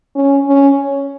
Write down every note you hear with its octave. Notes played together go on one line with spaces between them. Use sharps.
C#4
C#4